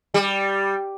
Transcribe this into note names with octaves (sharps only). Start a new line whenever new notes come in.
G3